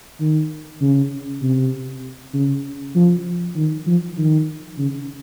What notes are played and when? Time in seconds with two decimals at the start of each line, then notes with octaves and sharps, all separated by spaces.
0.21 D#3
0.81 C#3
1.42 C3
2.34 C#3
2.96 F3
3.56 D#3
3.87 F3
4.17 D#3
4.78 C#3